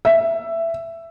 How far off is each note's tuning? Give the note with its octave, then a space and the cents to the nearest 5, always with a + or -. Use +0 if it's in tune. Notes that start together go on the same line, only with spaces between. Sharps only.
E5 +10